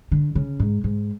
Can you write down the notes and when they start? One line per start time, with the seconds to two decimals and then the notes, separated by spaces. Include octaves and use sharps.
0.11 D3
0.35 C#3
0.60 G#2
0.84 G#2